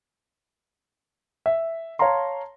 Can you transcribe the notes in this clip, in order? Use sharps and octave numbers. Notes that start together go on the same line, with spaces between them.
E5
C#5 F5 A5 A#5 C6